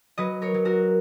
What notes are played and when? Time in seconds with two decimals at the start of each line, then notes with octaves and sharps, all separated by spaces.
0.18 F#3 B4 D#5
0.42 A#4 C#5
0.54 F#3
0.65 F#4 A#4